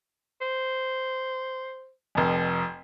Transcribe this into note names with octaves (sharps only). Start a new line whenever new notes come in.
C5
F1 F2